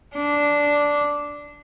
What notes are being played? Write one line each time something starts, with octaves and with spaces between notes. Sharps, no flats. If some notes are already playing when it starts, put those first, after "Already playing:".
D4